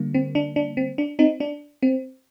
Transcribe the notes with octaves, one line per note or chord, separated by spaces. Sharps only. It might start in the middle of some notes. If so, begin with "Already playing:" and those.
Already playing: D3 G3 A#3
C4
D4
D4
C4
D4
C4 D#4
D4
C4